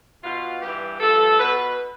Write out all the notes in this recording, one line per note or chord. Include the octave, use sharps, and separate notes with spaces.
B2 F4
G2 E3 G4
G2 F3 A4
B2 B4